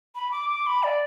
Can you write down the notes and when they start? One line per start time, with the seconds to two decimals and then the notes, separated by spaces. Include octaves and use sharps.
0.15 B5
0.31 D6
0.50 D6
0.66 B5
0.83 D5